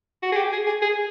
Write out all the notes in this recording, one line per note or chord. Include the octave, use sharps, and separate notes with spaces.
F#4
G#4
G4
G#4
G#4
G#4